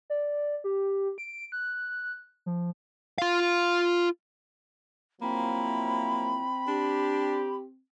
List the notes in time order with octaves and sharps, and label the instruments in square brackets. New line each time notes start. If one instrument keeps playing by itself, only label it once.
[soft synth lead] D5
G4
D7
F#6
F3
[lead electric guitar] F4 F5
[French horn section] F3 F#3 E4 [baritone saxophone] A#3 [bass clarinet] C4 [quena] B5
[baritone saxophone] D4 [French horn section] G4